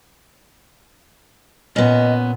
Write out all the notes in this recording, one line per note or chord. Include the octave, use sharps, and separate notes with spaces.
A#2 B3 C#4 D#5